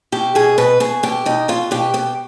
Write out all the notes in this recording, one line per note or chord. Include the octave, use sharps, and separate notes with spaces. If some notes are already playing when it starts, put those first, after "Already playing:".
B2 G4
B2 G#4
B2 B4
B2 G#4
B2 G4
B2 D#4
B2 F4
B2 G4
B2 G4